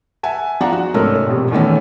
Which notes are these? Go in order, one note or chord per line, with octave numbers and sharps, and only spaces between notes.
E5 F#5 G#5 A5
F3 D4 G#4 F#5 A#5
F#4
C2 G#2 A3 C#4 A4 A#4
E1 A#1 C3
E2 D#3 E3 A3 C#4